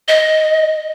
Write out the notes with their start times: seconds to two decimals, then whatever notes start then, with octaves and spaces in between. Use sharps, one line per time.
0.08 D#5